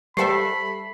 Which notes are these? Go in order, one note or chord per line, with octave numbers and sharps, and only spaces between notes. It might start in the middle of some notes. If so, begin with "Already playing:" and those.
G3 G4 A4 C5 E5 G5 B5 C7